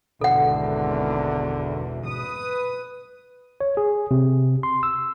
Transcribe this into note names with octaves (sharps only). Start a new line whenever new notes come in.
G#1 E2 B2 D3 A4 F#5
B4 D#6
C#5
G#4
C3
C6
E6